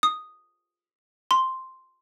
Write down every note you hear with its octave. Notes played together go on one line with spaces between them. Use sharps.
D#6
C6